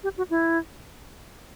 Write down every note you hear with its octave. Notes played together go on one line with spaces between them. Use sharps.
G4
F#4
E4